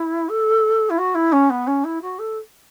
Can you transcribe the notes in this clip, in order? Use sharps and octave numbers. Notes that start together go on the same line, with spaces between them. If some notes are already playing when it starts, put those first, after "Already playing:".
Already playing: E4
A4
E4
F#4
E4
C#4
B3
C#4
E4
F#4
A4